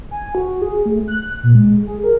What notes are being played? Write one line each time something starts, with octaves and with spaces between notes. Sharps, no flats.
G#5
F#4
G#4
A3
F#6
A#2
G#3
G#4
A#4